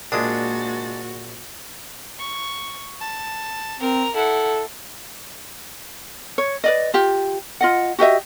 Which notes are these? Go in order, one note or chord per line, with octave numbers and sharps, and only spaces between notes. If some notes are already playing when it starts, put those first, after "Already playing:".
A#1 G#3 A#3 D4 F#4 D#6 A6
C#6
A5
C4 A#4 A#5
E4 A4 F#5
C#5
B4 D5 D#5
F4 G4
F4 D#5 F#5
F#4 G4 D#5 E5